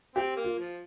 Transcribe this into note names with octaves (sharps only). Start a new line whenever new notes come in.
C4 G4
A#3
F4
F3